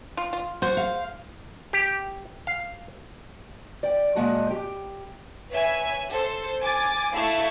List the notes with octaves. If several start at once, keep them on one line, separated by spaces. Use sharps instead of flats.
F4
F4
F#4 C5
F5
G4
F5
D5 G5
A#2 F#3 G#3 F#4 D#5 A5
G4 G5
B4 C#5 E5 G#5
A4 C5
G#5 D6 A6
A3 E4 E5 F5 A5 C#6